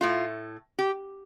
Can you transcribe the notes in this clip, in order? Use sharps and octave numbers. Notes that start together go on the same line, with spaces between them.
A2 A3 F4
G4